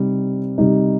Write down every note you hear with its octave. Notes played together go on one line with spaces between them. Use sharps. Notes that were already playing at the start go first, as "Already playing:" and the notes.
Already playing: C3 G3 D#4
C3 G3 D#4